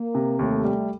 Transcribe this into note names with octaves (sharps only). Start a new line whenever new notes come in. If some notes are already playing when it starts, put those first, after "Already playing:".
Already playing: A#3
C3
D#2 A3
G3